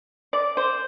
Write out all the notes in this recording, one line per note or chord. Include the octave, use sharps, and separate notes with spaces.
D5
C5